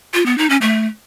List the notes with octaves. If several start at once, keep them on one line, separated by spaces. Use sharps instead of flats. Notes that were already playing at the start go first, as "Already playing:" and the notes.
F4
B3
D#4
C#4
A3